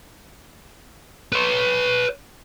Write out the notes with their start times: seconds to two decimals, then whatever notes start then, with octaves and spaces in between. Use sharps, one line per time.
1.33 B4 C#5